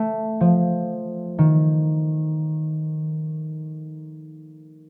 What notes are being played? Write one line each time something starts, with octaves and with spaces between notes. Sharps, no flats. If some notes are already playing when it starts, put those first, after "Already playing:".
Already playing: A3
F3
D#3